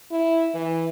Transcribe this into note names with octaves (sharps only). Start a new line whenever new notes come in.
E4
E3